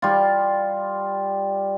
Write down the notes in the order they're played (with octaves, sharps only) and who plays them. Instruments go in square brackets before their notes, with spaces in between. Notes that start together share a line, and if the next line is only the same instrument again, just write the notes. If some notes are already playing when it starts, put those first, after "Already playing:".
[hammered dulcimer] G3 F4